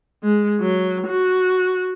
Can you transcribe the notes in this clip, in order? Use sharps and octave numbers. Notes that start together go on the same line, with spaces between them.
G#3
F#3
F#4